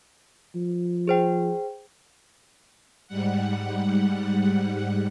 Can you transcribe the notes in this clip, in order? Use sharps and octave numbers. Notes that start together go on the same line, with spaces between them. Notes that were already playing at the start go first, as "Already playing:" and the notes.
F3
G#4 C5 G5
G#2 G3 F#5